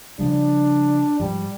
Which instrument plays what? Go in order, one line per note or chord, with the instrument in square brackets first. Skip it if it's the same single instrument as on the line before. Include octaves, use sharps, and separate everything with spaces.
[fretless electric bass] C#3 F3 G3 [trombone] D4
[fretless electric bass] G#2 F3 [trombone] G3